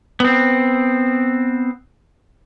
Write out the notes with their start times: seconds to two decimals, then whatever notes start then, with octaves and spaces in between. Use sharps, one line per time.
0.20 B3 C4